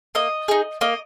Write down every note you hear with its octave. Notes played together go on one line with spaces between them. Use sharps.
A#3 D#5
D#4 G#4
A#3 D#5